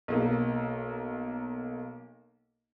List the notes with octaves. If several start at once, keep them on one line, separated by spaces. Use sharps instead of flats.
B1 A#3